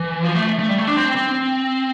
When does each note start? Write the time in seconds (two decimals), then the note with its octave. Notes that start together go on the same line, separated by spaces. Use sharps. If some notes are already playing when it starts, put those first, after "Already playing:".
Already playing: E3
0.23 F3
0.35 A3
0.59 A3
0.69 G3
0.78 A3
0.87 D4
0.96 C4
1.15 C4